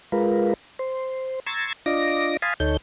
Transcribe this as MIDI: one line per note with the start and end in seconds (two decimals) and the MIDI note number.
0.12 0.54 56
0.12 0.54 65
0.12 0.54 70
0.12 0.54 71
0.79 1.40 72
1.46 1.73 82
1.46 1.73 84
1.46 1.73 85
1.46 1.73 88
1.46 1.73 92
1.46 1.73 93
1.86 2.37 62
1.86 2.37 65
1.86 2.37 75
1.86 2.37 86
1.86 2.37 94
2.42 2.54 77
2.42 2.54 80
2.42 2.54 81
2.42 2.54 83
2.42 2.54 84
2.42 2.54 87
2.60 2.77 38
2.60 2.77 63
2.60 2.77 69
2.60 2.77 73
2.60 2.77 91